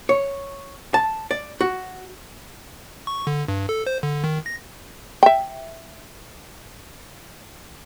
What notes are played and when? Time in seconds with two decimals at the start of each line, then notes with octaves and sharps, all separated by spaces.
0.09 C#5
0.94 A5
1.31 D5
1.61 F#4
3.07 C#6
3.27 D3
3.48 G2
3.69 A4
3.87 C5
4.03 D3
4.24 D#3
4.46 A#6
5.23 E5 G5